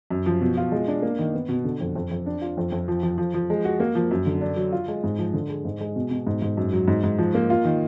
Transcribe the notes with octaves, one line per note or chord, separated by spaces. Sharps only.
F#2
F3
B2
F4
G#3
D4
A#3
D#3
B3
B2
D3
F2
F2
F2
D4
F4
F2
F2
F3
F3
F3
F3
G#3
F#4
A#3
F3
F#2
D3
D4
F#3
F4
G#3
G#2
F3
D3
G#3
G#2
G#3
B2
B2
G#2
G#2
F#2
F#3
G#2
G#2
F3
A#3
F4
D#3